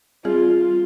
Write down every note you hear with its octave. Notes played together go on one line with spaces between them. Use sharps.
G3 C4 F4 G#4